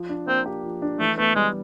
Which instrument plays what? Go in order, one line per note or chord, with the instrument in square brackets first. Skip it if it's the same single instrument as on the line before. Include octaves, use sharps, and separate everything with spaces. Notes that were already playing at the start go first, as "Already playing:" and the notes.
Already playing: [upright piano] F3
D4
[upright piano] A#3 [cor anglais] C4
[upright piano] G4
F3
D4
[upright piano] E3 [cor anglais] A3
[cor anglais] A3 [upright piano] B3
[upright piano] G3 [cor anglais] G#3